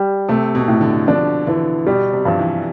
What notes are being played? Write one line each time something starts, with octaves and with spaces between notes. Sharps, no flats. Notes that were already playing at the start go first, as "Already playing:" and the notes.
Already playing: G3
C3 A3
B2
A2
D3
F3 D4
D3 E3
B2 G3
C3
G2 F3
E3